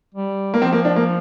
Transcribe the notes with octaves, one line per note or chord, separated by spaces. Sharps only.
G3
A#3
F3 C4
A#3
D4
A#3